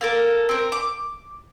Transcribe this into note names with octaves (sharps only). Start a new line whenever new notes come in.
A#3 A4 A#4
C4 A#4
D6